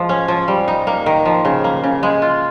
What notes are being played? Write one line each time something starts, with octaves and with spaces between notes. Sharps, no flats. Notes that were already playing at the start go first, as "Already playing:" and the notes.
Already playing: F3 G#3
C#4
F3
G3
D#4
A#3
D#3
F3
C#3
A#3
C#3
G#3
F4